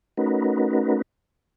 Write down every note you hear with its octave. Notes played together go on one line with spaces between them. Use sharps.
A3 C#4 D#4 F#4 A#4 B4